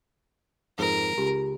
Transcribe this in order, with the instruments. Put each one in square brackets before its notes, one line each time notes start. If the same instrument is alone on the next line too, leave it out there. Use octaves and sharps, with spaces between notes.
[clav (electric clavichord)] F2 G#2 [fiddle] A#4
[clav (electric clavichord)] C#2 [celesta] G4